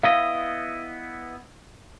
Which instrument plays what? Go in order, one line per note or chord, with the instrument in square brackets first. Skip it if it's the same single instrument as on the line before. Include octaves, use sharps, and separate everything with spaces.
[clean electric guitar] B3 E4 D#5 [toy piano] F5